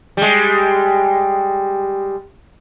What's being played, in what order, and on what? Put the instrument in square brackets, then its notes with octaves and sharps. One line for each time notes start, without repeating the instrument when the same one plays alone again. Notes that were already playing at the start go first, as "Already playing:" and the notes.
[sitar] G3 G#3